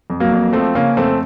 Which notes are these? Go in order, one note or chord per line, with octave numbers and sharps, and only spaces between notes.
F2
F#3 A#3
F2
F3 A3 C4
C#3 A#3 C#4
F2 A3 C4